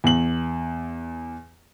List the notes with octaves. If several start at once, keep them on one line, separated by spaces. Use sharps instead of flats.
E2 F#7